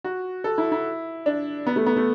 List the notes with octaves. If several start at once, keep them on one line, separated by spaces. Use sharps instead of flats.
F#4
A4
E4
E4
D4
B3
A3
B3
A3